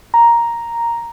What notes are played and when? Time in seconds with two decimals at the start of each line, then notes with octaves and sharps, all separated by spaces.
0.14 A#5